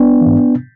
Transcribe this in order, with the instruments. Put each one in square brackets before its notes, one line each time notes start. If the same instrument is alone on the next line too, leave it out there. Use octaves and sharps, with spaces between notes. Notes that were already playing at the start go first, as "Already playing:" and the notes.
Already playing: [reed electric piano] B3 D4
G#2 E3